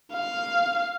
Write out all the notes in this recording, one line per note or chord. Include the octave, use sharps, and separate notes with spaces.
F5